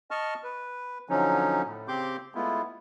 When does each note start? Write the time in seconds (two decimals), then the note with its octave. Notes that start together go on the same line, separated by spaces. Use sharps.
0.11 D#5 A5 C#6 F6
0.43 B4
1.09 D3 F3 F#3 C#4 D#4
1.66 A2
1.88 C#3 C4 G4 C6 D6 G6
2.35 G#3 A3 B3 E4 F4